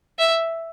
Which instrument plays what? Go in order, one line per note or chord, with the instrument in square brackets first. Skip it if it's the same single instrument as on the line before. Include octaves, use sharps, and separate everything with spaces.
[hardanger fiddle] E5